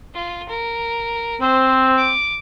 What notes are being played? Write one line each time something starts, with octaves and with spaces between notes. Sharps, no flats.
F4
A#4
C4 C5
D6